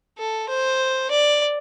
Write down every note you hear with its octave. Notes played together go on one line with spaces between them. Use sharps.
A4
C5
D5